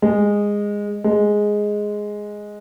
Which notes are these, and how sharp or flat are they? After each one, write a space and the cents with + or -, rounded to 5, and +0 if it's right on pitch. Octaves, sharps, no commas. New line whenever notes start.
G#3 -15
G#3 +0